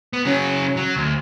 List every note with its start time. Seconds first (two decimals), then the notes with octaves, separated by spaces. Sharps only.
0.13 B3
0.25 C#3 F#3 C#4
0.77 F#3
0.96 D2